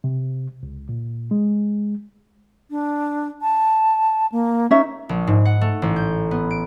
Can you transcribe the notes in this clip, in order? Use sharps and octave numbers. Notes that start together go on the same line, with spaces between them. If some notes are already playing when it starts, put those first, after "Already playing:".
C3
C#2
A#2
G#3
D4
A5
A#3
C#4 D#4 E5
A#1
G#2
F#5
A3
A1
G6
B3
D7